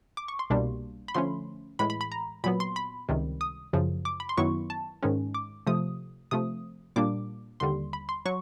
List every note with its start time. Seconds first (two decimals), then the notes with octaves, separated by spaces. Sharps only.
0.17 D6
0.28 C#6
0.39 C6
0.50 C2 B2 G3 A#3 D4
1.08 B5
1.14 D3 F3 A3 C#4 C6
1.79 A2 E3 G#3 B5
1.90 B5
2.01 B5
2.12 A#5
2.44 A#2 F#3 B3 B5
2.60 C6
2.76 B5
3.09 C#2 C3 D#3 G3
3.41 D#6
3.73 F#2 C#3 F3
4.05 D6
4.20 B5
4.29 C6
4.37 F#2 D#3 F#3 B3 E4 C#6
4.70 A5
5.03 G#2 D#3 G#3 C#4
5.35 D6
5.67 C3 F3 A3 D#6
6.31 C3 F3 A3 D#6
6.96 A#2 G3 A#3 D4 D6
7.60 D#2 D3 G3 C6
7.93 B5
8.09 C6
8.25 F#3 C#6